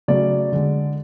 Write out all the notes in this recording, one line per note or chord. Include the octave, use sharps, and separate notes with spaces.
C#3 F#3 A3 D5
D3 G#3